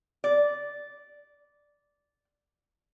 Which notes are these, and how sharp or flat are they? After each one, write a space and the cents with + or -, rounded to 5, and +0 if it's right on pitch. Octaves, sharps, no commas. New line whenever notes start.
D5 -10